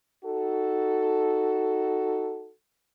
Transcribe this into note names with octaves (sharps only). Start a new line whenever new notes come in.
D#4 F#4 A4